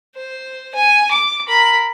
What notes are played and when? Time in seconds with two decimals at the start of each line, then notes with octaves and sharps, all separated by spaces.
0.15 C5
0.75 G#5
1.11 D6
1.47 A#4 B5